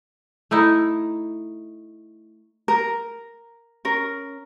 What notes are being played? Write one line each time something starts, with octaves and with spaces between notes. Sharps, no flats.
A3 D#4 E4
A#4
C#4 A#4